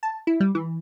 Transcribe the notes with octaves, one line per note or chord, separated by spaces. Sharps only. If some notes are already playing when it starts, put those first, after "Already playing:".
A5
E4
G3
E3